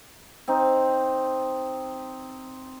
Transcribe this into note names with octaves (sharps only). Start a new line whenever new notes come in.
C4 D#4